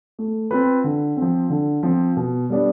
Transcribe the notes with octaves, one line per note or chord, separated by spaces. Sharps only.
A3
C4 F4 B4
D3
C4
F3
D3
F3 C4
B2
G3 B3 D4